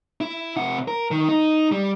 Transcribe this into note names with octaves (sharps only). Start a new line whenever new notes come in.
E4
C3 F#5
A#4
D#3
D#4
G3